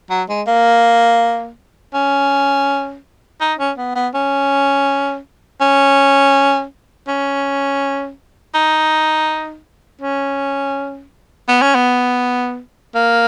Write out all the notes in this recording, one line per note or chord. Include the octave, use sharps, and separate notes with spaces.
F#3
G#3
A#3
C#4
D#4
C#4
B3
B3
C#4
C#4
C#4
D#4
C#4
B3
C#4
B3
A#3